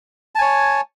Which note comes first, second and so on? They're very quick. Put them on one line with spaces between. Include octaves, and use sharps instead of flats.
A5 G#5 C#5